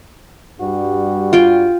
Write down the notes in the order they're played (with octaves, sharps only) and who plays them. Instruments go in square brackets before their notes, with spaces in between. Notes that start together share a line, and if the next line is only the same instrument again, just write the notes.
[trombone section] G2 G3 F#4
[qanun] F4 G5